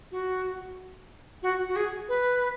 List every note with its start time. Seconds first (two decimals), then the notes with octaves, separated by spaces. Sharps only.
0.11 F#4
1.42 F#4
1.68 F#4
1.76 G#4
2.08 B4